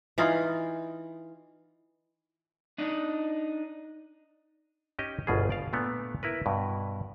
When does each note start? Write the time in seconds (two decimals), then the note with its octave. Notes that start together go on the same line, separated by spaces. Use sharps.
0.18 E3 D#4 F4
2.78 D4 D#4
4.99 C#4 D#4 G4 D#5
5.27 G1 C2 B2 F4 G#4
5.50 D5 F5
5.73 A#2 A3 B3 D4
6.23 E4 A#4 B4
6.46 G2 B2